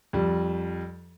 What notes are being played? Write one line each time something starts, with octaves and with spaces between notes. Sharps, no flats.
F2 G3